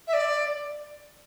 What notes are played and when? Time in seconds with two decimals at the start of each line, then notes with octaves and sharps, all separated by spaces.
0.07 E5
0.13 D5